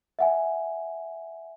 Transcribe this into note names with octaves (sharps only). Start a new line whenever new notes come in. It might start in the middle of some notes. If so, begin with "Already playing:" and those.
E5 F#5 G#5